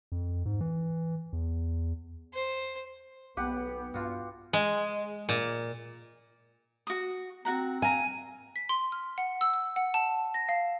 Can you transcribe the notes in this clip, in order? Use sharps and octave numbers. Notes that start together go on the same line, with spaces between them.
F2
G#2
E3
E2
C5
B1 B3 G4 B4 F#5
G2 F4 F#4
G#3
A#2
F#4 D#6
C4 F#4 F#5 A#5
F5 G#5 A#5
B6
C6
F6
F#5
E6
E6
F#5
A5
A#6
F5